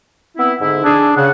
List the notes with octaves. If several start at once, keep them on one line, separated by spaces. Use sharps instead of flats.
B3 C4 E4
G#2 D3 E4
D4 G#4
C#3 C#5 F5 F#5